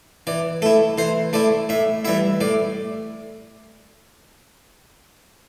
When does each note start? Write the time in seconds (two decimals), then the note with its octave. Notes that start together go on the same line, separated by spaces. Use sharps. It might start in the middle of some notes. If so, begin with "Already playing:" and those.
0.27 E3 D5
0.62 A3 E4 A4
0.98 E3 C5
1.33 A3 E4 D5
1.69 A2 E5
2.05 E3 G3 E4 E5
2.41 A2 D5